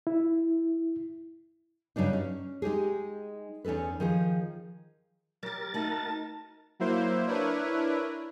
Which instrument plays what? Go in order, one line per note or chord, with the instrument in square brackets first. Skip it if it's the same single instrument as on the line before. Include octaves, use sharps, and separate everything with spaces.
[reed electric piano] E4
[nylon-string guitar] G2 C#3 F#3 D4 D#4
C#4
G#3 D#4 G4 G#4
E2 C#4 D#4 A4 B4
D#3 F3 G#4
[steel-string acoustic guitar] F#3 G4 [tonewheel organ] A#4 A6
[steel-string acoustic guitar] A3 F#4 F#5 [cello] D#4 [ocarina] A5
[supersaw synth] F#3 A#3 E4 C5
D4 E4 A#4 B4 C#5